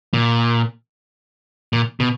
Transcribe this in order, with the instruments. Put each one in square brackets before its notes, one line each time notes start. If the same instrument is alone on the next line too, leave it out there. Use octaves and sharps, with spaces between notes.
[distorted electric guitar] A#2
A#2
B2